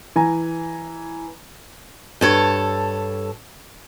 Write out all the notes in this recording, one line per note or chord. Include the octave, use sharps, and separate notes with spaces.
E3 G#5 A#5
G2 A4 C#5